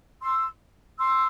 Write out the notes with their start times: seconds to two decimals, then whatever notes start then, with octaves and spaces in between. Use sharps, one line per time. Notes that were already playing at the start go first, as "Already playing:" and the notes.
0.21 C6 E6
0.98 C6 E6